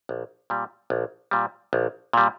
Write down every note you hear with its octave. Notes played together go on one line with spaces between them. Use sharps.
A#1
A#2 G3
A#1
A#2 G3
A#1
A#2 G3